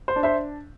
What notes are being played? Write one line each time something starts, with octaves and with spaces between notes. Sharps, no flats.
C5
D4
C5 E5